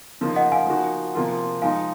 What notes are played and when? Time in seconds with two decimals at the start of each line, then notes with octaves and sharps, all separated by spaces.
0.21 C#3 F3 A#3 D#4
0.36 D#5 F#5
0.52 F5 G#5
0.67 F3 A#3 D#4 F#4
1.15 C3 F3 A#3 F4
1.62 F3 G#3 D#4 F5 G#5